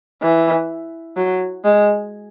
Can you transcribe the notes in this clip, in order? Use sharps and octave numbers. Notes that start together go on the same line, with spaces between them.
E3
F#3
G#3